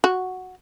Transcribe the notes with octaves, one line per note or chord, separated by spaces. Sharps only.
F#4